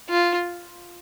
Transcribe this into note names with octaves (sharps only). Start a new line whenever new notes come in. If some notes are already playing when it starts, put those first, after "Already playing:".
F4